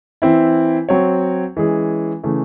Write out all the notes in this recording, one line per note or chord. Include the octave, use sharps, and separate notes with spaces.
E3 C4 E4
F#3 C4 F#4 C#5
E3 G#3 C#4 G#4
C#3 E3 A3